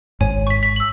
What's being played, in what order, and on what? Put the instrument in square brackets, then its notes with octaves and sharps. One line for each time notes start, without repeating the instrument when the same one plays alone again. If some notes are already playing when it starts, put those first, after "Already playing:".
[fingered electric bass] G#1 G#2 [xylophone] C#5 G#5
[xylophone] C#6 B6
B6
E6 F#7